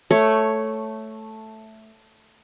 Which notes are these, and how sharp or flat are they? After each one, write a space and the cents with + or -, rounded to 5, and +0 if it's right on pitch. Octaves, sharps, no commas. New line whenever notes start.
A3 +0 C#5 +0